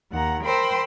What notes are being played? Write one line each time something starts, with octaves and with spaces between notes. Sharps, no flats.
D#2 F#5 A#5
A#4 C5 G5 B5 C6 E6